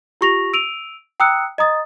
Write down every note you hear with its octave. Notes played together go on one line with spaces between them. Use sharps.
F4 G4 C#6 A#6 F7
E6 D7 D#7 F7
G5 A#5 D#6 E6 F#6 C#7
D#5 A#5 D#6 A6